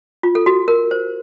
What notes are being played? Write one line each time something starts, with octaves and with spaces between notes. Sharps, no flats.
F4
A4
F#4
A#4
C5